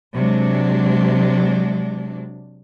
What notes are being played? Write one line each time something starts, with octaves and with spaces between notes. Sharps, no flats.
C3 F#3 G#3 D4